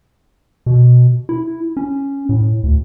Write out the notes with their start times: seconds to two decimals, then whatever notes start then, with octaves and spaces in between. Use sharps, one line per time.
0.66 B2
1.29 E4
1.77 C#4
2.29 A2
2.63 D2